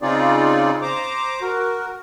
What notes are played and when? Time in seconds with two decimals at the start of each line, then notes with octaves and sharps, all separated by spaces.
0.01 C#3 C4 D#4 F4 G#4 D5
0.82 C5 A#5 D6
1.42 F#4 A#4